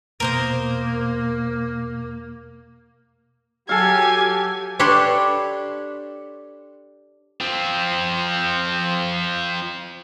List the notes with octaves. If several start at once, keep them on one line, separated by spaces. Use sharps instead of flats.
E2 B2 A#3 A#4 C5 D#6
F#3 G4 A4 F5 G#5
D4 G4 A4 C#5 B5 C6
F3 C4